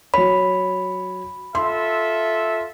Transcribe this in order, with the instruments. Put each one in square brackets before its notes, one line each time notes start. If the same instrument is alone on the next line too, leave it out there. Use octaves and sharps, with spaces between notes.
[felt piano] F#3 C#5 [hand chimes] B5
[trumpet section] F4 A4 E5 [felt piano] C6